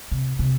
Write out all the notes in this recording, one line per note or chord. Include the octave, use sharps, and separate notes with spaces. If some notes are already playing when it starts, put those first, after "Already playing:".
C3
C3